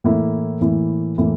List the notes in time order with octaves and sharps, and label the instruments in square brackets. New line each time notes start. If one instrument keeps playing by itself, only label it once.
[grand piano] A2 E3 A#3 E4
A2 E3 A#3 E4
A2 E3 A#3 E4